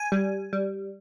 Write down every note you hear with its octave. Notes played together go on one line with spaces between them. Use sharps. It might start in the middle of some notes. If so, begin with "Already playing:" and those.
Already playing: G#5
G3
G3